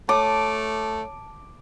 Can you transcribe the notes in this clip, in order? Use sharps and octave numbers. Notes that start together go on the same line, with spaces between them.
A3 C#5 A5 D6